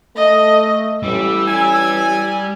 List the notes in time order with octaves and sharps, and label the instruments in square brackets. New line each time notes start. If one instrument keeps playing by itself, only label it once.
[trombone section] A3 [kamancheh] D#5
[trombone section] A1 [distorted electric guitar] G3 [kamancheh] E6
[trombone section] A1 [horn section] G#5